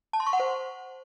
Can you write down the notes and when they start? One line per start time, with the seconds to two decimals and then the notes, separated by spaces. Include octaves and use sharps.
0.13 A5
0.20 C6
0.26 C#6
0.33 F#5
0.40 C5